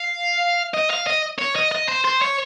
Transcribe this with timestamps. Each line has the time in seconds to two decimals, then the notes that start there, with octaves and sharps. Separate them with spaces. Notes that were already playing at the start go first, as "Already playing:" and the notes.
Already playing: F5
0.74 D#5
0.90 F5
1.07 D#5
1.39 C#5
1.56 D#5
1.72 D#5
1.88 C5
2.04 C5
2.21 C#5